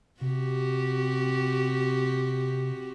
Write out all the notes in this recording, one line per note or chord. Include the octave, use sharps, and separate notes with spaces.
C3 C4 F#4 G4